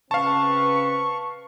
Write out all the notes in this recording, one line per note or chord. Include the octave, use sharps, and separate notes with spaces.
C#3 C4 B4 F5 A5 C#6